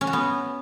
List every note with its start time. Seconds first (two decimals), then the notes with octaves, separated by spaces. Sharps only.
0.01 C#4
0.07 F#4
0.13 B3